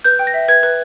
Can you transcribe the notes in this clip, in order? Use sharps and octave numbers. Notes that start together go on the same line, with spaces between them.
B4 G6
G5
A#6
E5
B4 G#6
B4